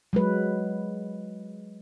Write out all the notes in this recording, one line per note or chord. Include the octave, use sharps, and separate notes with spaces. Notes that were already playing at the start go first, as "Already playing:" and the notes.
F#3 G#3 B4